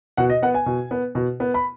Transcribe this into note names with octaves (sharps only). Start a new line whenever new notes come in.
B2 F#5
D#5
B3 F#5
G#5
B2
B3
B2
B3
B5